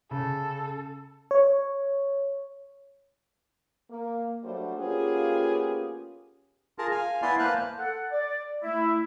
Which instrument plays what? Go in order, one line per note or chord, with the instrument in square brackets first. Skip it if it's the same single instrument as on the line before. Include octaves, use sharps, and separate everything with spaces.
[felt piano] C#3 [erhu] A4
[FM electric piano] C#5
[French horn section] A#3
F#3 G3 A3 D4 F#4 C5
A#3 B3 C#4 F4 G4 G#4
[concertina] F4 G#4 A#4 A5
F5 G#5
B3 E4 D5 G#5 C6
A#3 B4 C5 F5 A5 F#6
[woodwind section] A4 F#5
D5
A3 E4